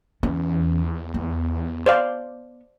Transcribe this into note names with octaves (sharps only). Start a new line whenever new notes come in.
E2 E3 C#4
B3
C5 D5 F5